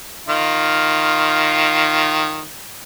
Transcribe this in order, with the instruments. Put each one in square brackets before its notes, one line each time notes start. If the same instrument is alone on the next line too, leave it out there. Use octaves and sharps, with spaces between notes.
[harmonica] D#3 F4